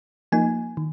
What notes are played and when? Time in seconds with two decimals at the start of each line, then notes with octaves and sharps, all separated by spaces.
0.32 F3 A#3 D#4 G#5
0.77 D#3